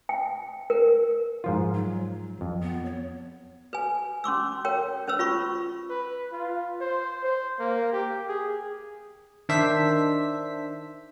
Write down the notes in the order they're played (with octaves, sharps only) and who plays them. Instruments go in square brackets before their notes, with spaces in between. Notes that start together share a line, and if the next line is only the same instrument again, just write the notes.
[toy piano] G5
A#4
[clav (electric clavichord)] G#2 F3 F4
[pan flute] F#3
[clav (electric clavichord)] F2
[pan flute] B3
C#5
[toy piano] B4 G#5
C#4 C6 D6 E6
A#4 C#5 G5
C#4 B4 C5 E6
F4 B5 C#6
[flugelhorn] B4
F4
C5
C5
A#3
G4
G#4
[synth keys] D#3 D4 C5 E5 B6